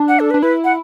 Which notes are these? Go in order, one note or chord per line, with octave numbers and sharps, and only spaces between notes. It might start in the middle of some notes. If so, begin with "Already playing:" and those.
Already playing: D4
F#5
A4
B4
D4
E4 B4
F#5